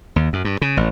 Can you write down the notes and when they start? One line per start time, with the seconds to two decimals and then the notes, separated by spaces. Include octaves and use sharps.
0.16 D#2
0.33 F#2
0.45 G2
0.62 C#3
0.77 A1